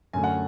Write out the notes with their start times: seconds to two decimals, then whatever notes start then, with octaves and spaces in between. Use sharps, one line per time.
0.13 F#2 D3 A3 G#5
0.24 F#5